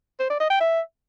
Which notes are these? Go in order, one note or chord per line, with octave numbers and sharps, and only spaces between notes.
C5
D5
D#5
G5
E5